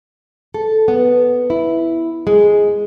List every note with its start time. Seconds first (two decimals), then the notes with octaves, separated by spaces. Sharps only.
0.54 A4
0.88 B3
1.50 E4
2.27 G#3